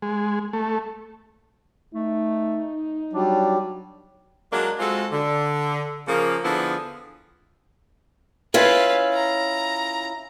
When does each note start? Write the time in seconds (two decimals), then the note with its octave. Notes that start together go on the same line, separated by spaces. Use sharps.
0.02 G#3
0.53 A3
1.94 A3 D#4
3.13 F#3 G3 D4
4.53 F#3 G#3 A#3 D4
4.80 G#3 C4 F4 F#4 A4
5.12 D3
6.08 C#3 F3 A#3
6.45 D3 F3 B3 E4 G#4
8.54 C#4 E4 F4 B4 F5
9.14 A#5